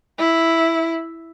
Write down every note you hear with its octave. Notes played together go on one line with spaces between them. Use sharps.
E4